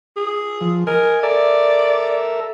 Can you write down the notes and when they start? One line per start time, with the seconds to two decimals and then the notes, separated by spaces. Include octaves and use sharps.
0.17 G#4
0.61 F3
0.87 A#4 D#5 G#5
1.23 A4 A#4 D5 E5